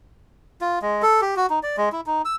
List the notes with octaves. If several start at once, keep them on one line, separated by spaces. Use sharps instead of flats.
F4
G#3
A4
G4
F#4
D#4
D5
G#3
E4
D#4
E6